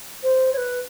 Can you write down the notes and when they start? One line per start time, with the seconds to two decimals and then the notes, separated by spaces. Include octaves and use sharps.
0.23 C5
0.53 C#5
0.57 B4